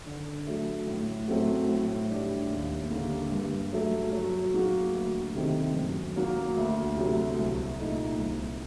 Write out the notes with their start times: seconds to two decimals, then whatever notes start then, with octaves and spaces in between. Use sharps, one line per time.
0.06 D3
0.47 F#3 A3
0.87 A2
1.28 F#3 A3 C4 F#4
1.68 A2
2.10 G3 D4
2.51 D#2
2.91 D3 G3 A#3
3.32 G2
3.73 F#3 A3
4.12 F#3
4.54 A#3 F#4
4.94 D2
5.35 C3 D#3 A3 C4
5.75 F#2
6.16 F#3 A#3 F#4
6.57 D2
6.97 C3 F#3 A3
7.38 C2
7.79 A#2 A3 D#4
8.20 C2